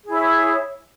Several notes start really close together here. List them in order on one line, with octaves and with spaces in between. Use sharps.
G#4 E4 C#5